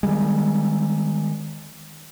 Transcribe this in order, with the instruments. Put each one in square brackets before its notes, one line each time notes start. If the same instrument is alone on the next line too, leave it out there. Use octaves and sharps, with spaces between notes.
[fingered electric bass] D#3 G3 G#3